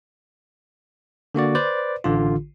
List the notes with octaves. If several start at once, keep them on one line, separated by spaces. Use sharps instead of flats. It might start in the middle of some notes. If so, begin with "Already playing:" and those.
D3 A#3 F#4 D5
B4 C5 D5
A1 D3 F4